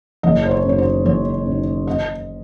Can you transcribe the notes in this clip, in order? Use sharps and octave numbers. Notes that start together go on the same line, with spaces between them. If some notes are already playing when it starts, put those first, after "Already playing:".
F#1 D#5
C5
C#5
F#2 D#3 C#5
C5
F#1 C#5
F#2
D#3
D#5